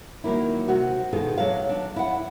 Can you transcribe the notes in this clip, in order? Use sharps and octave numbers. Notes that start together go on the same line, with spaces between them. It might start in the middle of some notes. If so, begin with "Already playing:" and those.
D#3 F#3 A#3 E4
C3 F#4 C5
B2 D#3 F4 G#4 A4
F#3 D4 E5 F5
D4
E4 F#5